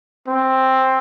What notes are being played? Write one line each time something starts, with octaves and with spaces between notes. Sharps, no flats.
C4